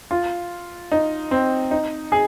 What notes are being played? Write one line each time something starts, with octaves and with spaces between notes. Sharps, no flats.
F4
D#4
C4
D#4
G#4